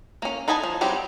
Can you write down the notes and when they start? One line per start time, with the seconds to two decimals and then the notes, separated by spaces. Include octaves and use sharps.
0.22 A#3 C#4
0.48 D#4 B4 D#5 G#5 A5
0.63 F3
0.81 F#3 G3 C4 G4